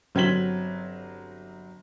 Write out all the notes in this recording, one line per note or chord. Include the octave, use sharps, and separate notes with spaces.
G1 F#3 C4 G#6 B6 F#7